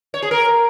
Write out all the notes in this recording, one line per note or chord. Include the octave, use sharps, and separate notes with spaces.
C#5
G#4
A#4